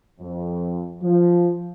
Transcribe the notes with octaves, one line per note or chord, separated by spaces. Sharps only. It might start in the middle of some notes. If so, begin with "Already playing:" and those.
F2
F3